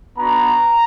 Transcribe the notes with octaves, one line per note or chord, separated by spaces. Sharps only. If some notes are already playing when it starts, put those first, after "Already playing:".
B3 D4 F#4 A#5